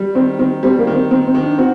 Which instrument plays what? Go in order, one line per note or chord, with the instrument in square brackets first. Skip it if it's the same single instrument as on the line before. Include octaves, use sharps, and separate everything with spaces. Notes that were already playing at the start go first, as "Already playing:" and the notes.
Already playing: [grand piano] G3
[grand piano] D#3 [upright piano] C4
[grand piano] D#3 [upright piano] C4
[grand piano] G3 [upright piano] C4
[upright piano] A#3
[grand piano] D#3
[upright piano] C4
[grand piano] D#3 [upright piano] C4
[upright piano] C4
[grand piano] D#3
[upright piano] D4
[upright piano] C4 [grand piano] F#4